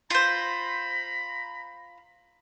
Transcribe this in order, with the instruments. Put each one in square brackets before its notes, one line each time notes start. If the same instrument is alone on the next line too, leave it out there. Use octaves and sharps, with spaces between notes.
[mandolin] F4 C5 [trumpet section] A#5 B5